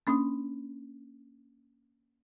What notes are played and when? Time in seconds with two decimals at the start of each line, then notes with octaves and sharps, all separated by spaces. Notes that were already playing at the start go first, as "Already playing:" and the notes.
0.07 A#3 C#4 D4 D#6